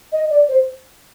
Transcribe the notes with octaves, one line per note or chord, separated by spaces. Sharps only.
D#5
D5
C5